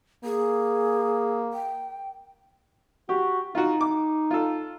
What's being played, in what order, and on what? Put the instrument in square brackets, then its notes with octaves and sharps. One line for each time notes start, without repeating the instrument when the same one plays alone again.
[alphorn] A#3 [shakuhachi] G#4
[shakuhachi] G5
[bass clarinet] F#4 [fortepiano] G4
[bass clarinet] D#4 [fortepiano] F4 F#4
[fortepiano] D6
F4 A4